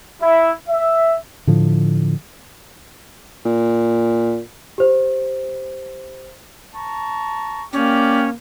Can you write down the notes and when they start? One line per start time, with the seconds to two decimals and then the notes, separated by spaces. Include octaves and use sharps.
0.22 E4
0.69 E5
1.47 A2 D3 F3
3.45 A#2
4.78 G4 C5
6.75 A5 A#5 C#6
7.73 A#3 C#4 G4 D5 G5